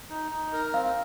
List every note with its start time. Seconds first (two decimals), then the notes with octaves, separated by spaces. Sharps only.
0.10 D#4
0.32 D#4
0.53 A#4
0.73 C4 F5